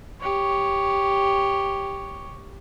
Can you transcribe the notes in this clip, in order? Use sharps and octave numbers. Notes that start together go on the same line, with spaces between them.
G4 C#5